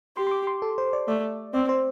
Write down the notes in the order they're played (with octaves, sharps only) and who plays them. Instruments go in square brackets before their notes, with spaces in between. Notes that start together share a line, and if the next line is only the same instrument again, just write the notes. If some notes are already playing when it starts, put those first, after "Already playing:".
[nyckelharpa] G4 [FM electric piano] C6
[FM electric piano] C6
D6
C6
A4
C5
D5
[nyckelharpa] A3 [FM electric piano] D5
[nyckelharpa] C4 [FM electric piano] D5
[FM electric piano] C5